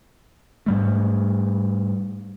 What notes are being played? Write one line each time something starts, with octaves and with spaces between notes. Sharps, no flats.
G#2 G3 A3